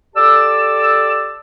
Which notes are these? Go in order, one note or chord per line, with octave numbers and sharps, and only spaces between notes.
G4 A4 D5 A5 D6 E6